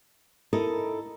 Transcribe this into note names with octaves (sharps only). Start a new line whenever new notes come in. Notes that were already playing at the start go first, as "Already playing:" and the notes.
D#4 E4 A4 A#4 D#5